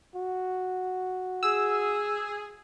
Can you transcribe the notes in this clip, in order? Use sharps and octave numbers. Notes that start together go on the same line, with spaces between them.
F#4
G#4 E6